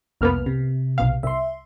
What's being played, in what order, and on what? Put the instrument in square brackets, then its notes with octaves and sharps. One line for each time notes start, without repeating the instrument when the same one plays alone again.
[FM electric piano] C2 F6 [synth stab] F2 A#3 B3
[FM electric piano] C3
[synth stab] B1 B2 F5
[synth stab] C2 [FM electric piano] E5 C6